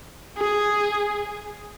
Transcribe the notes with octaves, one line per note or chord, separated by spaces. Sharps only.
G#4